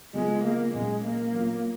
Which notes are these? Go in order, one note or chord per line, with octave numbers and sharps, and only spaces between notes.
C#3 F#3 G#3 B3 F4 G#4
A#3
A#2 F#3 G#3 C#4
A#3
F#3 B3 F4